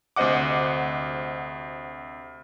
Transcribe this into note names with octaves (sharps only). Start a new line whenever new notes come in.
D2 C3 C5 D#5 F#5 D6